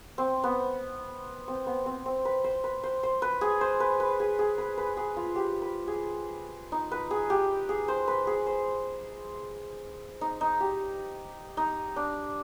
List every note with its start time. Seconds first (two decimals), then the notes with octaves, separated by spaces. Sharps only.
0.18 C4
0.44 B3
1.48 C4
1.66 B3
1.86 C4
2.06 C4
2.25 B4
2.44 C5
2.64 B4
2.83 C5
3.03 C5
3.22 B4
3.41 G#4
3.61 C5
3.80 B4
4.00 B4
4.20 G#4
4.39 G#4
4.58 B4
4.77 B4
4.97 G#4
5.16 F4
5.36 G4
5.62 B4
5.87 G#4
6.72 D#4
6.91 B4
7.11 G#4
7.30 G4
7.69 G#4
7.88 C5
8.08 B4
8.27 G#4
8.46 C5
10.21 D#4
10.41 D#4
10.60 G4
11.57 D#4
11.96 D4